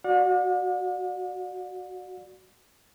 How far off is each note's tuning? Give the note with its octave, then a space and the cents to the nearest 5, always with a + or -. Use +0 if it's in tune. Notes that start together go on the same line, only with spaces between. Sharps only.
F#4 +0 D5 +10 F#5 -45